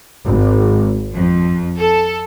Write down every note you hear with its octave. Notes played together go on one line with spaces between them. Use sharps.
G#1
F2
A4